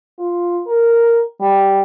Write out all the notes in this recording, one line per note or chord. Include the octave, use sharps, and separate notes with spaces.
F4
A#4
G3